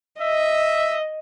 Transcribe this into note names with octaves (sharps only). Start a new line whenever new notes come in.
D#5 E5